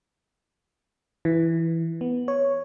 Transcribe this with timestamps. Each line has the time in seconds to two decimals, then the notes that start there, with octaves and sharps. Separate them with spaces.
1.25 E3
2.01 B3
2.28 C#5